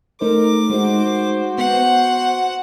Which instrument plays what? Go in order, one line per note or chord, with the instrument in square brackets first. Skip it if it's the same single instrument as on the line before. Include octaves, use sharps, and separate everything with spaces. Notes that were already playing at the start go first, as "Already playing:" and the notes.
[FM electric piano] A3 D#4 C5 [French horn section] A#4 [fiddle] D6
[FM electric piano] G#3 D#4 [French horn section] F#4 C5
[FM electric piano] B3 [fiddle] F#5